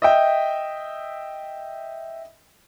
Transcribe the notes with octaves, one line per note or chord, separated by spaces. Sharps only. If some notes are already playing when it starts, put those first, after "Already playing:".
D#5 E5 G5